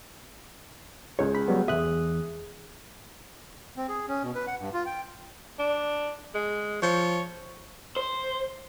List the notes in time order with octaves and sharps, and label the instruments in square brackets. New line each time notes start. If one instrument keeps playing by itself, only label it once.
[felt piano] C#2 G#3 [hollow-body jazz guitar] C#5
[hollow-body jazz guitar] B5
[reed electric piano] F#3 G3 B3
[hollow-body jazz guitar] E2 B2 E5 [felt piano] G#3 [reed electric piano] D#6 F#6
[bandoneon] C4
G#4
C#4
B2
B4
F#5
G2
F4
G5
[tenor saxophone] D4
G#3
[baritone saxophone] F3 [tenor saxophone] C#5
[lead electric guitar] C5